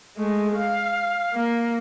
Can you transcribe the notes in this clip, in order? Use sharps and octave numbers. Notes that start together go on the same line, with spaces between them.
G#3 A3
F5
A#3